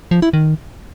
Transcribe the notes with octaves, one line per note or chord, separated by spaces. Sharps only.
F3
E4
D#3